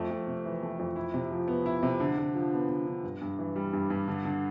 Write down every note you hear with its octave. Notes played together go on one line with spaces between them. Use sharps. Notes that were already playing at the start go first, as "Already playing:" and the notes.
Already playing: F2 A3
F2
C3
E3
A3
F2
E4
C3
F3
B3
E4
C3
D3
D3
F3
B3
D3
D3
G2
G2
E3
G3
G2
G2
D3
D3